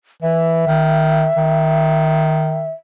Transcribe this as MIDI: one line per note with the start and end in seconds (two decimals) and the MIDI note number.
0.22 0.62 52
0.22 2.71 76
0.67 1.28 51
1.37 2.69 51